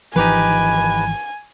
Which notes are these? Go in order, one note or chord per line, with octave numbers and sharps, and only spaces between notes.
G#1 E3 F3 D#4 G4 B4 G#5